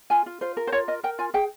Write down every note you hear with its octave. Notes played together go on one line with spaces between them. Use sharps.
F4 G#5
F4
F4 C5
A#4
C5
F4 C#5
A#4 D#5
A#4 G5
F4 G#5
G#4 G5